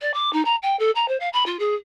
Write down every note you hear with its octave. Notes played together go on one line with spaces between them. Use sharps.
D5
D6
D#4
A#5
G5
A4
A#5
C5
F5
B5
F4
G#4